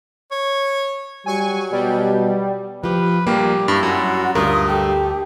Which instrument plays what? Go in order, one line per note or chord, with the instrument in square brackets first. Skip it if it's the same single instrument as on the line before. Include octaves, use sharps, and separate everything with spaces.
[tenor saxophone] C#5
[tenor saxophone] F#3 [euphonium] G3 [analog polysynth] G#5 C#6
[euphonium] B2 [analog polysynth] G3
[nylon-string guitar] F3 G4 [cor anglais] B4
[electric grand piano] A#1 A#3 [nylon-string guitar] G3 [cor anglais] G4
[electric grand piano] G2 [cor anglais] E4
[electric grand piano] F#2 [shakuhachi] F#4
[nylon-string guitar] D2 A#4 [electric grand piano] G2 [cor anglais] F4 [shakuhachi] D#6
[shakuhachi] G4 [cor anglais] A4